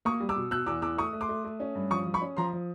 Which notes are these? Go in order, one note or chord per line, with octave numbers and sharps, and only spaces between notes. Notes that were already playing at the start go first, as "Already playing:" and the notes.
A#3 C#6 D#6
G3
D6 E6
B2
B2 E6 F#6
E2 D6 E6
E2 D6 E6
A3 C#6 D#6
A3
C6 D6
A3
A3
C#4
G2
F3 C#6 D#6
F3
B5 C#6
C#4
F3 A#5 C6
F3